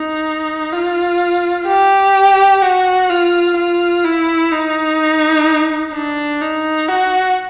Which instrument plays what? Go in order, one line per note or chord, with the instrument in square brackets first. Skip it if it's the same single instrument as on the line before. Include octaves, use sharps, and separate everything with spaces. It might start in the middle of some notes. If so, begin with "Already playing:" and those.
Already playing: [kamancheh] D#4
F4
G4
F#4
F4
F4
E4
D#4
D4
D#4
F#4